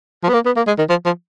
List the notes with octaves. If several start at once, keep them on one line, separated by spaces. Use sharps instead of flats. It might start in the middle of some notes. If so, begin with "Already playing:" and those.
F3
B3
A#3
B3
A#3
G#3
D#3
F3
F3